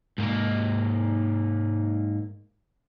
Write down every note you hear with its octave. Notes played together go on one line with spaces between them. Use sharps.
G#2 A#3